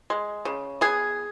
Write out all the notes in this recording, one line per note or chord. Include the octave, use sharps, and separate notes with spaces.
G#3
C#3
B3 G#4